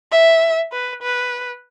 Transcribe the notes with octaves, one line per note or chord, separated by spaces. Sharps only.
E5
B4
B4